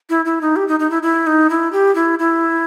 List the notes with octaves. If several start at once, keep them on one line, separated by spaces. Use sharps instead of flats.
E4
E4
D#4
G4
D#4
D#4
E4
E4
D#4
E4
G4
E4
E4